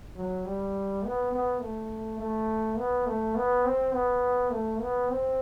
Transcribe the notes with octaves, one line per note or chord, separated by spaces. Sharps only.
F#3
G3
B3
B3
A3
A3
B3
A3
B3
C4
B3
A3
B3
C4